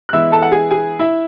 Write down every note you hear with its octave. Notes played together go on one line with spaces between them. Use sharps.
F#6
E3 G#3 B3 E4 E5 E6
A4 A5
F#5
G#4 G#5
G#4 G#5
E4 E5